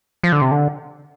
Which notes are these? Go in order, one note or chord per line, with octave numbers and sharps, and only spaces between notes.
F3
D3
C3
D3